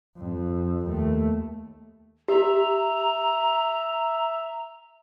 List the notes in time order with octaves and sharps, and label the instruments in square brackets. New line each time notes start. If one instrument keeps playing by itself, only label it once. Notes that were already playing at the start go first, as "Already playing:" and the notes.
[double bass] F2
D#2 A3
[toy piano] G4 [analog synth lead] E5 [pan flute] A#5